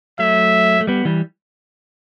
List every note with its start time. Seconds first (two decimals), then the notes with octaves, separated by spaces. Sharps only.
0.19 F#3 A3 E5
0.80 A3
0.87 G3 B3
1.05 E3 G3